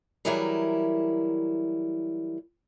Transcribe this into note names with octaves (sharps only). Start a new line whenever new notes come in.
E3 F#3 G3 E4 G#4 A#4